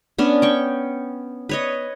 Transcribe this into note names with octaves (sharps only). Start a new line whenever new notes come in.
B3 C#4 D4
G5 C#6
B4 C#5 D#5